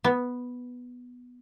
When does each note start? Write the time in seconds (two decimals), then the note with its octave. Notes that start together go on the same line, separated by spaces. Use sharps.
0.04 B3